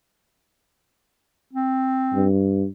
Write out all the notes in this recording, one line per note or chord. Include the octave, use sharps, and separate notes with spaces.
C4
G2